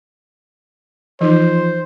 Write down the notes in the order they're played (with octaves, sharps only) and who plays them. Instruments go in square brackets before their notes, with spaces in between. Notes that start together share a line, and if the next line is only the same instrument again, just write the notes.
[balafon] E3 D#4 [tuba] F3 [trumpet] C5